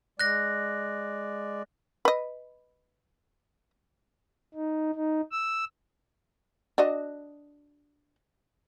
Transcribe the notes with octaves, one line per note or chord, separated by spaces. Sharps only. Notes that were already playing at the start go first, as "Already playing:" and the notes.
G#3 D5 F#6 A#6
B4 D#5
D#4
D#4
E6
D4 F#4 D#5